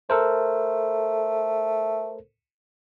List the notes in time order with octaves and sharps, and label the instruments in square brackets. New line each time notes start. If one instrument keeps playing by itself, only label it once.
[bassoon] A3 [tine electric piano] A4 A#4 C5